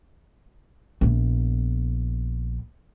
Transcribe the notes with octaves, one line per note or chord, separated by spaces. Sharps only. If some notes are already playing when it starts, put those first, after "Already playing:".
A#1 B3